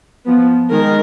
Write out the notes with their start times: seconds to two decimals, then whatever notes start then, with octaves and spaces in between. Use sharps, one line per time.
0.26 F3 B3
0.71 D#3 G#3 A#4